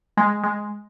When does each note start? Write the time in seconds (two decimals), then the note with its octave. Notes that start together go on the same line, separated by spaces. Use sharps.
0.17 G#3
0.44 G#3